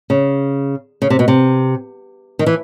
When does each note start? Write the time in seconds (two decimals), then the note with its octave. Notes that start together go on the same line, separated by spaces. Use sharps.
0.10 C#3
1.02 C#3
1.10 C3
1.19 B2
1.28 C3
2.39 D#3
2.46 E3